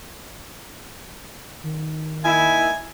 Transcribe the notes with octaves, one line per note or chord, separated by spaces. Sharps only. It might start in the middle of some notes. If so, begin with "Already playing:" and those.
D#3
A#3 D#4 E4 G#5